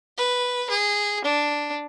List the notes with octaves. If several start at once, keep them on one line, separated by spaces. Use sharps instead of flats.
B4
G#4
D4